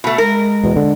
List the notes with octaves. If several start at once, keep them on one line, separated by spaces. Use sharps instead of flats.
B2 A3
G#3 A#4
E2 B2
D3